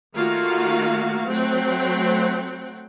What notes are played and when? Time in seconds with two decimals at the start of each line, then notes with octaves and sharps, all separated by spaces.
0.15 D#3 A3 A#3 F4 F#4 F5
1.28 F#3 A3 C4 F#5 G5